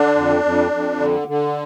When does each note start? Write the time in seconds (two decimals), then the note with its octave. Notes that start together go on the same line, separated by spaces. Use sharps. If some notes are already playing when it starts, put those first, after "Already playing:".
Already playing: D3 D4
0.16 F2
0.44 F2
0.72 F2
1.00 D3
1.28 D3